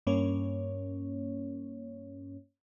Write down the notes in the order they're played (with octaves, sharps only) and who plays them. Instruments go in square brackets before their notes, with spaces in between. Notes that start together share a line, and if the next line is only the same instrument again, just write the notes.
[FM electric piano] G2 A#3 C#4 C#5